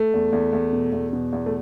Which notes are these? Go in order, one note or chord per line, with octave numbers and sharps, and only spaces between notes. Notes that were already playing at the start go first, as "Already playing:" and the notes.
Already playing: A3
E2
E2
E2
B2
E2
B2
E2
A3